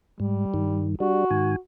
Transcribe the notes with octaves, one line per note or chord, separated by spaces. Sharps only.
G#2 G3
G2 D#3
G3 D4 F#4
G#2 D#3 G#5